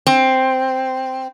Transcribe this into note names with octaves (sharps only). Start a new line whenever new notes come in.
C4